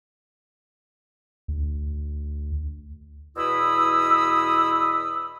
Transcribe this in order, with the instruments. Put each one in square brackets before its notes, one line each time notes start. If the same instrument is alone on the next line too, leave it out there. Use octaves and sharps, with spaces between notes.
[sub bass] D2
[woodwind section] E2 B2 E4 B5 D#6 E6